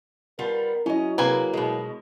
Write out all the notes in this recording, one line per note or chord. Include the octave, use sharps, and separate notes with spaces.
G3 B3 F4 A#4
F#3 C#4 E4 D#5
C3 A#3 G#4 B4 G#5
B2 G#3